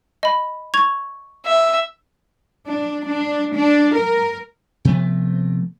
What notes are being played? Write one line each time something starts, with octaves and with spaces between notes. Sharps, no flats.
D#5 B5
C#6 G#6 F7
E5
D4
D4
D4
A#4
C3 F3 A3 B3